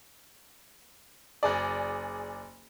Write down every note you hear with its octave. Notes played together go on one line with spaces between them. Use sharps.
F#1 G#4 D5